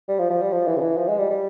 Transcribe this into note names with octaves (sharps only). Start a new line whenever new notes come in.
G3
F3
F3
G3
F3
E3
C#3
E3
F3
G#3
G3
G3